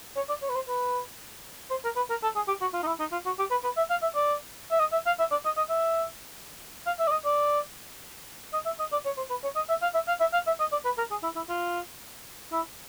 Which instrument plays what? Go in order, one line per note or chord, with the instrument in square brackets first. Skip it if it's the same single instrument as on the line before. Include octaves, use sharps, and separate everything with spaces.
[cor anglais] C#5
D5
C#5
B4
C5
B4
C5
A#4
B4
A#4
A4
G#4
G4
F#4
F4
D#4
E4
D#4
F4
F#4
G4
B4
B4
E5
F5
E5
D5
E5
D#5
E5
F5
E5
D5
D#5
D#5
E5
F5
E5
D5
D#5
D5
D#5
E5
D#5
D5
C#5
C5
B4
C#5
D#5
E5
F5
E5
F5
E5
F5
E5
D#5
D5
B4
A#4
G#4
E4
E4
F4
E4